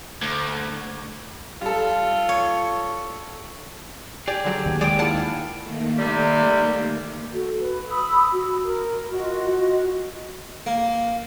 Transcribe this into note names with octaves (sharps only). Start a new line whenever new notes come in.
D2
G3 F4 A4
C#5
G4 G#4 D5
D3 F#3
D#2 D#3
G#3 D5 G5 D6 D#6
E4 F4 F#5 A5 C7
D#3 A3 A#3
C3 G3
F#4 A4
B4
B5 D#6 E6
F#4
A#4
F4 F#4 D#5
A#3